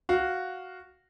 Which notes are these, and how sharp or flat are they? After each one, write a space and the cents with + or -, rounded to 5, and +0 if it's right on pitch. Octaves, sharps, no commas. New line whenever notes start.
F#4 +0 F5 +0